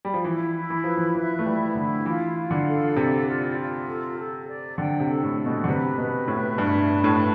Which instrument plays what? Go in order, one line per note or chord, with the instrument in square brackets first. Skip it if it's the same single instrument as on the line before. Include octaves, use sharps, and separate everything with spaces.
[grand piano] G3
F3
[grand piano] E3 [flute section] E4
[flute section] E4
[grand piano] E3
[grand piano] F3 [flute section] B4
[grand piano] E3
[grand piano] E3 [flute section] E5
[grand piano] A3
[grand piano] G3 [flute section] E4
[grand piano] D3 [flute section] E4
[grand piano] E3 [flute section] F4
[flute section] F4
[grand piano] D3
[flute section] A4
[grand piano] C3 [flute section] D5
[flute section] F4
F4
A4
A4
D5
[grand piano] D3 [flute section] G5
[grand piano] C3
[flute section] A4
[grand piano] A2
[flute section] A4
[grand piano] B2
D3
[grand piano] C3 [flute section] B4
[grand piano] B2 [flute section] B4
[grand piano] A2 [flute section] E5
[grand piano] G2 [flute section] A5
[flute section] B4
[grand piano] A2
[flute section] B4